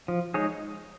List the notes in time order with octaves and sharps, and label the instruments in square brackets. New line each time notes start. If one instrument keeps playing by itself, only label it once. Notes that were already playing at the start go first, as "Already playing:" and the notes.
[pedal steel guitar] F3
G#3 D#4 G#4 C#5